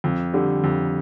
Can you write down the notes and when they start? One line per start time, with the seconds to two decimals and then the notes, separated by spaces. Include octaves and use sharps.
0.04 F2
0.34 D3 G3
0.64 F2